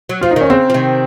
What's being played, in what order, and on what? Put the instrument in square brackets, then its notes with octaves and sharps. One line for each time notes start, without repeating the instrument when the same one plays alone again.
[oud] F#3
[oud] F3 [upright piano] F4
[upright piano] D#4
[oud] D#3 [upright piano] C#4
[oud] C#3 [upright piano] C4
[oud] F3
C3 D#3